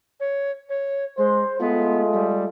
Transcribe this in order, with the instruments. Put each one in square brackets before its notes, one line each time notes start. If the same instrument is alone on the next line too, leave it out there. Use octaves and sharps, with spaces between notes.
[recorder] C#5
C#5
[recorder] G#3 [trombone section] C5
[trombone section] G#3 A3 F4 [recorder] B3
[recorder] G3